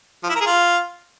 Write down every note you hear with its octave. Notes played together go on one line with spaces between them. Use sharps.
F3
E4
A#4
G#4
F4